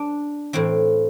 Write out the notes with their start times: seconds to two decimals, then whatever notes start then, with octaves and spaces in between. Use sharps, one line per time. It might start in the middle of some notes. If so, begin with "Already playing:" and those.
Already playing: D4
0.53 A2 E3 C4